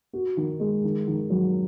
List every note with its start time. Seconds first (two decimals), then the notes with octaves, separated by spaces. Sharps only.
0.13 F#4
0.37 D#3
0.60 G#3
0.84 D#3
1.08 D#3
1.30 F#3